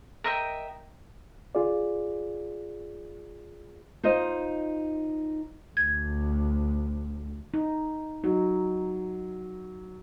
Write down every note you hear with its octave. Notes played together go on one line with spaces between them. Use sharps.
A#4 D#5 E5 G5
F4 G#4 D5
D#4 F4 C5 D#5
D2 G#6
D#4
F#3 D#4